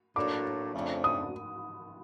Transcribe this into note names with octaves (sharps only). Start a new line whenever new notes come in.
A2 F#3 A#3 D4 D6
F2 C#3 F3 A3 D4
D#6